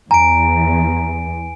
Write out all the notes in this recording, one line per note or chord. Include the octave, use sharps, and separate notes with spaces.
E2 G#5 A#5 D7